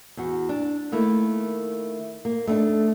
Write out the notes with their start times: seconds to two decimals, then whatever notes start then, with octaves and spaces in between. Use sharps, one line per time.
0.17 E2 F#4
0.49 D4
0.92 D#3 A3 A#3 E4
2.25 A#3
2.47 A3 B3 D4 D#4 A4